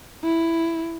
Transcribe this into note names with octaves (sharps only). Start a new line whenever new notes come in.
E4